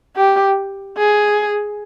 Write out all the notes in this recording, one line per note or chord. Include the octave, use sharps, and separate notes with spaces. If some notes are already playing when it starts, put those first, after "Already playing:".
G4
G#4